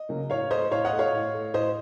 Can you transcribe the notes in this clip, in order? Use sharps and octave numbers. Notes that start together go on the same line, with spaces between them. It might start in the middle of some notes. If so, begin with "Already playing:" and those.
Already playing: D#5
C#3 F#3 A#3
A2 C#5 F5
A3 C5 D#5
A2 C#5 F5
D#5 F#5
A3
C#5 F5
A2
A3
A2 C5 D#5